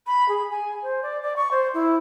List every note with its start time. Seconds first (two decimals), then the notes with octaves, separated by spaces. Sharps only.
0.06 B5
0.28 G#4
0.51 G#5
0.82 C5
1.02 D5
1.22 D5
1.36 C#6
1.51 C5
1.74 E4